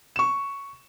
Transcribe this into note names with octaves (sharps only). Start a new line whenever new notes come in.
C#6 E7